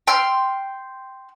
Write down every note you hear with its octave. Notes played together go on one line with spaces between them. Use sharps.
G5 C6 F6